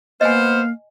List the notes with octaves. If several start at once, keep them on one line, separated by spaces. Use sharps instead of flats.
A#3 B3 C5 D#5 F5 G#5